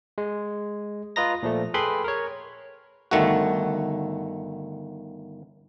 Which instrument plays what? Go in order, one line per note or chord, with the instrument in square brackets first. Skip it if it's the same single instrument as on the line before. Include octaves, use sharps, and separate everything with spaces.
[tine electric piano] G#3
F4 B4 D#5 A#5 A#6
A#2 F3 A3
G#4 A4 B4 G5 B5 C6
A#4 C#5
[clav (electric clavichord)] G1 D#3 A3 F#4